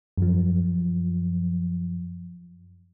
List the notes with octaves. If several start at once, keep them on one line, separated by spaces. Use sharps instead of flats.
F#2 F3